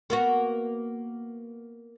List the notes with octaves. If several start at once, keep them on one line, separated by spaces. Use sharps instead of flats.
A#3 B3 F#4